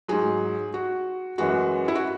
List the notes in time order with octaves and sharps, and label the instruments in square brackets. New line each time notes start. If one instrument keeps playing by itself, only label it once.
[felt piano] G#2 F#3 G#4
F#4
F#2 E3 G#3 F#4
E4
F#4